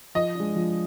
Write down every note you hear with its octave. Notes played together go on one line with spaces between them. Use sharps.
F3 D#5
G#3 D4
F3